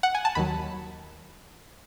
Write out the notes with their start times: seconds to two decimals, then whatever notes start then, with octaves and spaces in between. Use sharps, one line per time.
0.03 F#5
0.15 G#5
0.25 A5
0.35 D#2 D#3 F#3 B5